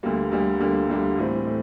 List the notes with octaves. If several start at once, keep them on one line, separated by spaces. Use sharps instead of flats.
D2 D3 G3 A#3
D2 D3 G3 A#3
D2 D3 G3 A#3
D2 D3 G3 A#3
A2 E3 G3 C4
A2